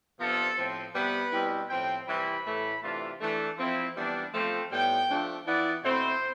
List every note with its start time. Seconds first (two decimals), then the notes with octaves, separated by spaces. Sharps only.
0.19 C3 F3 B3 D4 F4 A4
0.57 A2 F3 C4
0.95 C3 G3 B3 B4
1.32 B2 G3 C4 E4
1.69 A2 F3 C4 G5
2.08 C3 E3 G3 C4 E4 B5
2.45 A2 E3 A3 E4
2.82 C3 E3 A3 D4 F4
3.20 E3 A3 D4
3.57 F3 C4 E4
3.95 E3 G3 B3 D4
4.33 F3 A3 C4
4.71 A2 G3 B3 G5
5.08 F3 A3 D4 F4
5.46 E3 B3 E4 D5
5.83 B2 A3 C4 E4 C5